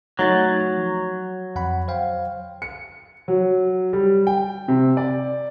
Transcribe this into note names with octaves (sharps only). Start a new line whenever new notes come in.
F#3 A3 D#4 A6
F3
F2 F#5 B5
C5 F5 G5
C#7
F#3
G3
G5
C3
D5